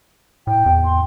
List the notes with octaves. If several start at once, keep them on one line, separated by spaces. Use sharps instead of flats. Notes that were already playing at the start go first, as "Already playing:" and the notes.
A2 G5
E2
C6